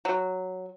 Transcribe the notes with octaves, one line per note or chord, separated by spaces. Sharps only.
F#3